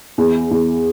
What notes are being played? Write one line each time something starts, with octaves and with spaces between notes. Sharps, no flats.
E2
E2